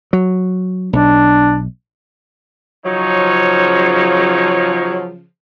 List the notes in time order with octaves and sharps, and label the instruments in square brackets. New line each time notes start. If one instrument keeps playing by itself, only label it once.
[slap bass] F#3
[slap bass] B1 [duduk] D4
[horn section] C#3 F3 [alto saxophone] F#3 [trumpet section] D#4 C#5